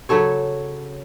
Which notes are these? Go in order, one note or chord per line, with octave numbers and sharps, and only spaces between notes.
C#3 F#3 A4 C#5